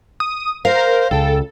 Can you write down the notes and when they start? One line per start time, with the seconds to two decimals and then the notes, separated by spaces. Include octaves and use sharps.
0.20 D#6
0.65 A#4 C5 F5
1.11 C#2 C#3 A4 G5